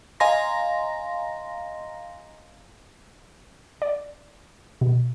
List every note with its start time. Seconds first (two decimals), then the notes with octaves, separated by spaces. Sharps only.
0.20 D#5 F5 G#5 A#5 C6 A#6
3.82 D5
4.81 B2